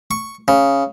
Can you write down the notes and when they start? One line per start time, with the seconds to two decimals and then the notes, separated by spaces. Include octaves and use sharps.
0.11 C#6
0.48 C#3